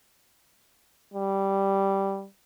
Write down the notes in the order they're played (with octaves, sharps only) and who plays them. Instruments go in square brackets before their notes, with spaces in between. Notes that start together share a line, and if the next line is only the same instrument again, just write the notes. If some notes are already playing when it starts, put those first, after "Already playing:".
[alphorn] G3